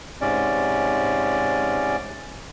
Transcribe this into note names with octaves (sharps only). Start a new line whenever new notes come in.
G#2 C3 C#4 D5